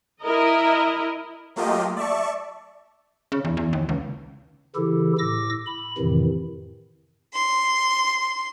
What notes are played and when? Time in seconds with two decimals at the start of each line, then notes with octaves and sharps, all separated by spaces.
0.21 E4 A#4 D#5
1.56 F#3 A3 A#3 F4 G4 D#5
1.96 D5 E5 A5 C#6
3.32 C#3
3.45 E2
3.57 E2
3.73 D#2
3.89 C#2
4.76 C#3 E3 E4 G4 A4
5.19 A2 D6 E6 A#6
5.67 B5
5.98 F2 A2 C3 D#3 E3
7.33 C6